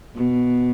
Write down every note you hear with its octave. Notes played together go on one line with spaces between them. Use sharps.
B2